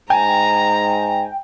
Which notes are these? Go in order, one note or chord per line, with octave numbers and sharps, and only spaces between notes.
G#2 G5 G#5 A#5